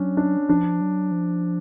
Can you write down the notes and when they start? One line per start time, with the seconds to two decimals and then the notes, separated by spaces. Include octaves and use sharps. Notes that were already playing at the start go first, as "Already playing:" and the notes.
Already playing: F#3 C#4 D4
0.17 D4
0.49 F3 D4
0.81 F#3
1.12 F3